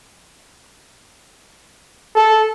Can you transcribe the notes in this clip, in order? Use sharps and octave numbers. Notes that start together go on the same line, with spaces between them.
A4